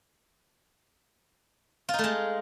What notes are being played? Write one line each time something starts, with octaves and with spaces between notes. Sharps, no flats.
F4
D#4
A3
G#3